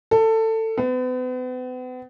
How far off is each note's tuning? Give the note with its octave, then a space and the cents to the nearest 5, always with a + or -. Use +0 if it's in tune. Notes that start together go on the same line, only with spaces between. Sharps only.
A4 +20
B3 +40